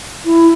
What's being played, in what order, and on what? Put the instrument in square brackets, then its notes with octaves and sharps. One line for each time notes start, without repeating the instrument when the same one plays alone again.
[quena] E4